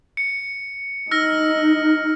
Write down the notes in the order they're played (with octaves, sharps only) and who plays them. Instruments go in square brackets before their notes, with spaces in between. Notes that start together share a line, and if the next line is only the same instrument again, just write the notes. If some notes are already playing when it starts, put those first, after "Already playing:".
[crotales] C#7
[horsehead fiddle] D#4 [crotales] E6 F6 A#6